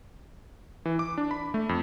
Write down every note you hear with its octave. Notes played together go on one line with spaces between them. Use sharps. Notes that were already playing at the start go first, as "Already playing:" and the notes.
E3
D6
D4
B5
A3
F2